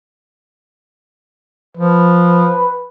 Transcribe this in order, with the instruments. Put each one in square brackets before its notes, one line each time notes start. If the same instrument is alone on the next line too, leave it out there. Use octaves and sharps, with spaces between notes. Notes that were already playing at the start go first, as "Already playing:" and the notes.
[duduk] F3 [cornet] B4